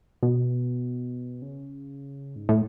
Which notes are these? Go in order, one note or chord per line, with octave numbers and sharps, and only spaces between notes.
B2
C#3
G#2
A2